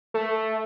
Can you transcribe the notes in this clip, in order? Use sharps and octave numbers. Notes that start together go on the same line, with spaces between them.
A3